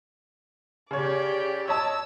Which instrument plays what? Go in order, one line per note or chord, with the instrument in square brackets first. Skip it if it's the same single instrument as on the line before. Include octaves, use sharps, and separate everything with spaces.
[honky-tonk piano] C#3 C#5 [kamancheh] G4 D5
[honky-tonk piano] C#5 D#5 A5 [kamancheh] E6